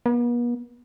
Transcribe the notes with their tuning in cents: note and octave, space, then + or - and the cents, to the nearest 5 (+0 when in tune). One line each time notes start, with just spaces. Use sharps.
B3 -45